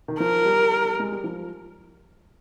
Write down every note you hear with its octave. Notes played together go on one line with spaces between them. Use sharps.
D#3
F3 A#4
G3
G#3
G3
F3